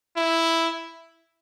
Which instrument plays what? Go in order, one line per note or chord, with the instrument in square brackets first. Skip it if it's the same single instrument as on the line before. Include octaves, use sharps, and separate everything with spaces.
[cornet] E4